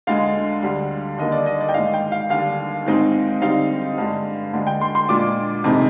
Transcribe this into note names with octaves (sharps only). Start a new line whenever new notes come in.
D2 D3 G#3 F5
D2 D3 G3
D#2 D3 G3 A#3 D#5
D5
D#5
D5
G5
G#2 D#3 G#3 F5
G5
F5
D#2 D3 G3 F5
G#2 D#3 G#3 C4 D#4
D3 G3 C4 D#4 F5
G2 D3 G#3 D4
D2 D3 G#3 D4
G5
C6
C6
A#2 G#3 D4 F4 D6
F2 C3 D#3 G#3